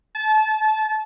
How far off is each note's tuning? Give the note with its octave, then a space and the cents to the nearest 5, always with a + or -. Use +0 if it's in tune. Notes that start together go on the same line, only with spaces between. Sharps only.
A5 -25